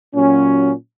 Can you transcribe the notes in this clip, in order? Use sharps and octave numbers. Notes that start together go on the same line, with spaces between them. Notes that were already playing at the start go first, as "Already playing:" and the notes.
A#2 F#3 C#4 F#4